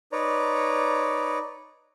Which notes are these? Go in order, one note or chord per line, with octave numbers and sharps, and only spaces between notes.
D#4 B4 C#5 D5 A#5